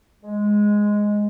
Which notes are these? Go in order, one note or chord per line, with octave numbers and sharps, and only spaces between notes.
G#3